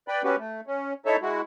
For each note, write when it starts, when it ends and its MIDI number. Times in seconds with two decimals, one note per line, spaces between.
0.08 0.22 71
0.08 0.22 74
0.08 0.22 79
0.08 0.22 83
0.24 0.36 59
0.24 0.36 61
0.24 0.36 66
0.24 0.36 67
0.24 0.36 71
0.38 0.61 57
0.67 0.93 61
1.06 1.16 63
1.06 1.16 64
1.06 1.16 69
1.06 1.16 73
1.06 1.16 76
1.22 1.41 56
1.22 1.41 64
1.22 1.41 66